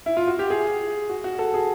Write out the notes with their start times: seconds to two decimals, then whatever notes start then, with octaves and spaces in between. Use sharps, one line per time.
0.06 E4
0.17 F4
0.28 F#4
0.39 G4
0.50 G#4
1.09 F#4
1.24 F#4
1.39 A4
1.54 G#4